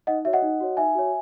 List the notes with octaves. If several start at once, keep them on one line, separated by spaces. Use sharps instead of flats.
D#4 D#5 F#5
F#4 C#5 E5
D#5 F#5
D#4
F#4 C#5
D#4 E5 G#5
F#4 C#5